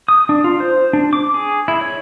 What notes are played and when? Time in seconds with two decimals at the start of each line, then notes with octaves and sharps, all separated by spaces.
0.09 D#6
0.29 D4
0.44 F4
0.60 C5
0.93 D4
1.13 D6
1.34 G#4
1.68 E4
1.81 C#5